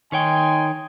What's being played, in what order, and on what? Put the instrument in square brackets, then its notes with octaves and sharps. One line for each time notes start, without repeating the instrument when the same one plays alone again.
[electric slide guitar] D#3 C#5 G5 [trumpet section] D#4 G#5 C6